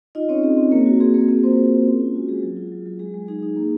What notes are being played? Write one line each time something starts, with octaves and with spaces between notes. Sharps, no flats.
D#4 F4 D#5
C4 C#4 C#5
C4 G#4
C4
A#3 C4 A#4
F#4
C4 G#4
A#3 F#4 A#4
A#3 C4 A#4
C4 F4 C5
F4 G#4
F4
C#4
F4
G#3 F#4
G#3 G#4
F#3
F4
F#3
F#3
G#3 G#4
G#3
D#4 G#4
D#4
A#3